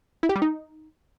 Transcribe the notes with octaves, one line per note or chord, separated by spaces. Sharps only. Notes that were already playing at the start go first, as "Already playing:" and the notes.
E4
G4
G3
D#4